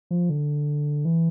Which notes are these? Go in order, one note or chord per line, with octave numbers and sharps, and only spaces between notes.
F3
D3
E3